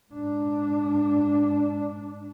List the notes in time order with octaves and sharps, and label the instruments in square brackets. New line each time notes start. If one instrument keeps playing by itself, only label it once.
[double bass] G#2 D4